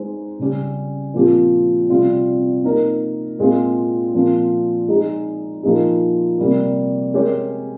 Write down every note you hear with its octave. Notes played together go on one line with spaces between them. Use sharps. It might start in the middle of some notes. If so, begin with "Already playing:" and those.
Already playing: G#3 D#4 G#4 C5
C#3 G3 C#4 G4
A#2 F3 C4 G4
C3 G3 C4 F4
A#3 D#4 A#4
A#2 G#3 C4 F4
A#2 F3 C4 F4
G#3 D#4 G#4
A#2 F3 A#3 D#4 G#4
C3 G3 A#3
G#3 C#4 G4 A#4 C#5